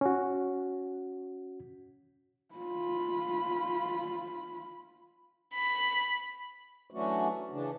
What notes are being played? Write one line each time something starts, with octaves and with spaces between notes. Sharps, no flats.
C#4 F#4
F4 B5
B5
E3 F#3 A3 C#4 D4 F#4
C#3 E3 D4